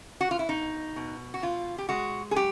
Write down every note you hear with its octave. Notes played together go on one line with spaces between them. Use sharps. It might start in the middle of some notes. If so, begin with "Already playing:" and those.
F#4
F4
E4
B2 D#4
B2
F#4
B2 F4
G4
G#3 F#4
G#4
F#3 G4